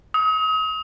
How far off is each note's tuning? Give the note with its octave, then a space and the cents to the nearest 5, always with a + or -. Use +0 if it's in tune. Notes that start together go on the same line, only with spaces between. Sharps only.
D#6 +35